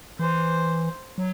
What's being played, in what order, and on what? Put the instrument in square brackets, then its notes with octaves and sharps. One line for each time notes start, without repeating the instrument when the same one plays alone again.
[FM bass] E3 [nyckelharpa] C5
[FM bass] F#3